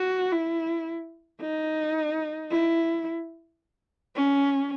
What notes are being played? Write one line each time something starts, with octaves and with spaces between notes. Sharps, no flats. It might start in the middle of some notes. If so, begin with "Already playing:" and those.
Already playing: F#4
E4
D#4
E4
C#4